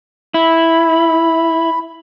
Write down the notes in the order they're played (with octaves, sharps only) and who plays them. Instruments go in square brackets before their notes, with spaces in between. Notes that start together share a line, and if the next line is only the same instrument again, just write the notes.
[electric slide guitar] E4 [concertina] B5